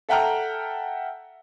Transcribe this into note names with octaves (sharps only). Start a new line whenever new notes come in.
A4 E5 F#5 G5 A#5 F6